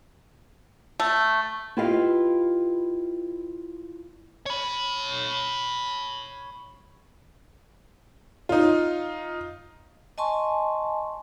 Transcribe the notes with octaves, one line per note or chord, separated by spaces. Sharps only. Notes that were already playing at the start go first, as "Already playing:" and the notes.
A3
E4 F4 G4 B4 D#5 F5
C#5 B5
D#4 F4
D#5 G#5 A5 C6 C#6